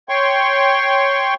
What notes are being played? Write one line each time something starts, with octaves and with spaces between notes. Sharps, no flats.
C#5 G5 C6 C#6